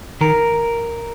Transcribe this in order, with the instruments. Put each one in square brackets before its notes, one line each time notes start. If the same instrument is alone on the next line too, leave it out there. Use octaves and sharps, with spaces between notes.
[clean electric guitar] D#3 A#4